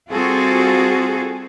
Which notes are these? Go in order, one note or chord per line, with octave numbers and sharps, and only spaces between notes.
G3 C4 F4 F#4 G#4 A4